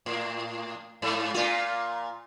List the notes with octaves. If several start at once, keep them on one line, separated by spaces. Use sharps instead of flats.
A2
G#2
A#2 F4